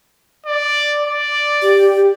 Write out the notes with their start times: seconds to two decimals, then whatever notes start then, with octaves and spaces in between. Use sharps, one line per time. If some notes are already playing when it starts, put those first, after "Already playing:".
0.46 D5
1.04 D5
1.62 G4